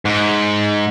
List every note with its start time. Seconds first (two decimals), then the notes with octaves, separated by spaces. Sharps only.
0.05 G#2